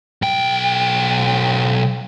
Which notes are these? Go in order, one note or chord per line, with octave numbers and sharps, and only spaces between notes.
B1 G5